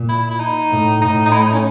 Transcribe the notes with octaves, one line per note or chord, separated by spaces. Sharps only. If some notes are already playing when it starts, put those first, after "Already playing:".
Already playing: A#2
E4
E4
D#4
A2
A2 D#4
D#4
E4
D#4
C#4